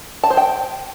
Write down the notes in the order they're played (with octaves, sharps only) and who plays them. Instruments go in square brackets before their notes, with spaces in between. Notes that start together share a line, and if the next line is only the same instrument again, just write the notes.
[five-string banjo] A5
C5
G5